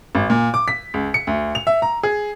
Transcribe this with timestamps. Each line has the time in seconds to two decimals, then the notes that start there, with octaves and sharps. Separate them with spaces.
0.15 G#1
0.30 A#2
0.54 D6
0.68 B6
0.94 C#2
1.14 C#7
1.27 D2
1.55 F7
1.67 E5
1.82 A#5
2.03 G#4